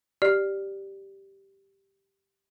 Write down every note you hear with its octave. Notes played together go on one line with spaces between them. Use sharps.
G4 D5